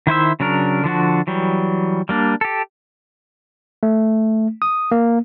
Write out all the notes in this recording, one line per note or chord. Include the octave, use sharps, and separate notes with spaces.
D#3 E4 C5 E5
C#3 F#3 D4 A#4
D3 F3 D4 F#4
E3 F#3 G3
G3 A#3 D4
G4 A4
A3
D#6
A#3